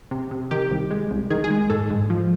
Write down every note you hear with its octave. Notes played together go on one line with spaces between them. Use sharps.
C3
C3
D#3 G4
C2
G#3
C2
D#3 G#4
G#4
G#3
G#2 A4
G#2
F3